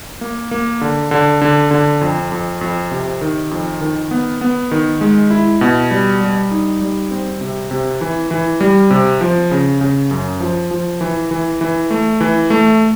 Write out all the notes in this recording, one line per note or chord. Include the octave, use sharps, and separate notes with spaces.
A#3
A#3
D3
D3
D3
D3
F2
F2
F2
C3
D#3
F2
D#3
B3
B3
D#3
G#3
E4
B2
G3
G3
D#4
G3
C4
C3
C3
E3
E3
G3
C3
F3
C#3
C#3
F#2
F3
F3
E3
E3
E3
A3
E3
A3